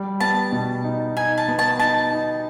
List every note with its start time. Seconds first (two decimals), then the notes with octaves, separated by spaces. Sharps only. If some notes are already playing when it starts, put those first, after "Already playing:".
Already playing: G3
0.20 B3 A5
0.52 B2
0.84 D#4
1.16 D#4 G#5
1.38 A5
1.48 B3
1.59 A5
1.80 D#4 A5
2.12 D#4